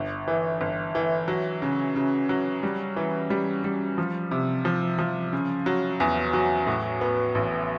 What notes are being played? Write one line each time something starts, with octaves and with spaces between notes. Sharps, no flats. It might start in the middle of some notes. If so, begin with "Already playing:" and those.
Already playing: G1
E3
G1
E3
F#3
C#3
C#3
F#3
G3
E3
G3
G3
F3
C3
F3
F3
C#3
F#3
E2
F#3
A2
B3
A1